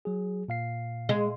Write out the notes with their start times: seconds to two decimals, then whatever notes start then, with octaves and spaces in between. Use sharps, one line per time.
0.05 F#3 G#4
0.48 A#2 F5 C7
1.09 G#3